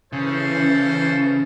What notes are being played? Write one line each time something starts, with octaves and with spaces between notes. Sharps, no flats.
C#3 E3 A4 C5